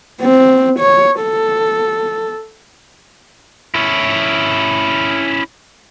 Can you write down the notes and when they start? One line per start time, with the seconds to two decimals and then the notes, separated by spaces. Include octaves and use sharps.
0.21 C4
0.80 C#5
1.20 A4
3.74 C#4 E4